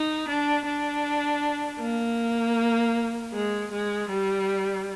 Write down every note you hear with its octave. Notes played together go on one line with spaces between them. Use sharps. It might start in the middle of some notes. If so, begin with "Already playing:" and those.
Already playing: D#4
D4
D4
A#3
G#3
G#3
G3